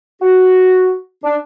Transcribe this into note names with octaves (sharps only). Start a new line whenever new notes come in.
F#4
D4